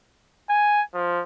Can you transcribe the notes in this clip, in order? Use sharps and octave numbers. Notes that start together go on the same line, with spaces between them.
G#5
F3